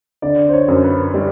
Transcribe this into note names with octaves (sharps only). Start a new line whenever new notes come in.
D3 D5
C5
C#5
F#2
B4
G3